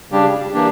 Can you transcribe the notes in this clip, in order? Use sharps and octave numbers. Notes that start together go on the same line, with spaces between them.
C#3 G3 D4 G4
E3 A#3 D4 G4